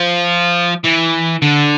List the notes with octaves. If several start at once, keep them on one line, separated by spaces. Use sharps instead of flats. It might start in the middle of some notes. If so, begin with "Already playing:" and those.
Already playing: F3
E3
D3